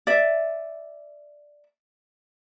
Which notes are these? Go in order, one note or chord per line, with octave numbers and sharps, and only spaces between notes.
D5 E5